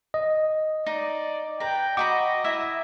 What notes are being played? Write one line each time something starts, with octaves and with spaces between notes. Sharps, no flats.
D#5
D#4 D5
B4 G5 A#5
F#4 D#5 A#5 B5 D6
E4 E5 A#5